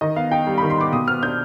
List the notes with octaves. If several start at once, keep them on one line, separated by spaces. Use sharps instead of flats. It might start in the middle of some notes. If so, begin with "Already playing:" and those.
D#3 D#5
B3 F5
D#4 G5
G3
D#3 B5
C6
B3 D6
B2 D#6
B3 F6
D4 G6